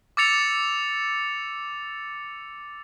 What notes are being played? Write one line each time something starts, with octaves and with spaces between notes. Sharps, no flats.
D6 E6 A6 C#7 F7